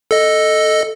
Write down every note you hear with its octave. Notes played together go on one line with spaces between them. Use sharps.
A4 D#5